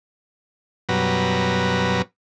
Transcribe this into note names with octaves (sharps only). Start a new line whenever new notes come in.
F#2 B2 F#3 G3 B4 A#5